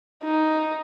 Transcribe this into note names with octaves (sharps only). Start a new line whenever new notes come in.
D#4